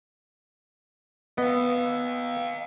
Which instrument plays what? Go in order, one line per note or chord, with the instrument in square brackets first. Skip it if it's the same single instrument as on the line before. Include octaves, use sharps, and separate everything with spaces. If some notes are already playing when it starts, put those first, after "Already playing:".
[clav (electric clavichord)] B3 [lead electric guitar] D#5 F5